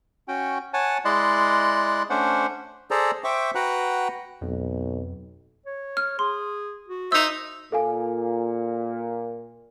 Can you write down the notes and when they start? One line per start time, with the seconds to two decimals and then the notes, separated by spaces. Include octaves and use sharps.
0.28 C#4 F#4 G5
0.74 C#5 F#5 G#5 A5
1.05 G#3 E4 D5 D#5 C6 F#6
2.10 A3 C#4 D4 C5 F#5
2.91 G#4 A4 C5 D5 A#5
3.24 C5 E5 G5 C#6 D6
3.55 F#4 B4 F#5 G5 A#5 F#6
4.41 B1 F2
5.66 C#5
5.97 F6
6.19 G#4 C6
6.89 F#4
7.12 D#4 C5 E5 E6
7.72 A#2 A4 F5 G#5